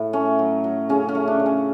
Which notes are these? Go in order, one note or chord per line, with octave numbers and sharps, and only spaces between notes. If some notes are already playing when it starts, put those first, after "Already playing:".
Already playing: A2
A3 C#4
F#3
F#3
C#3 C#4
C#4
A3
D4
C#3
C#4